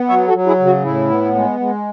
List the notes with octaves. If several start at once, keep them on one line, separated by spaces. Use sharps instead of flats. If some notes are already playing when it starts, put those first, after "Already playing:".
Already playing: B3
F#3 C#5 E5
F#4 A4
F#3
E4 G#4
C#3
F#4
A2 E4
B3
G#3
G#3